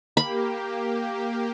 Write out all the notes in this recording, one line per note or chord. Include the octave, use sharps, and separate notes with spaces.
A#3 G4 B5